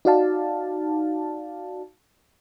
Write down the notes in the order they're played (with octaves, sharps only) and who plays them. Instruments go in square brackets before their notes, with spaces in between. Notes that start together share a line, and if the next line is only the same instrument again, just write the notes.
[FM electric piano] D#4 F#4 D5 F5 A5